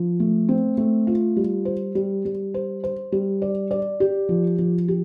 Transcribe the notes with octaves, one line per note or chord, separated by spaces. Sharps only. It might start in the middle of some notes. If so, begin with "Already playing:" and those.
Already playing: F3
A3
C4
A3
F4
G3
C5
G3
G3
C5
C5
G3
D5
D5
G4
F3
F3
G4